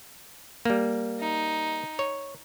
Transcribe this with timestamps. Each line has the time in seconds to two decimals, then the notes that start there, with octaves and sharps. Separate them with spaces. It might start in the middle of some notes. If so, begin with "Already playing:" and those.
0.65 G3 A#3
1.20 D#4
1.99 C#5